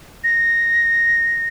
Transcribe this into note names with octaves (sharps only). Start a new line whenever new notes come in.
A#6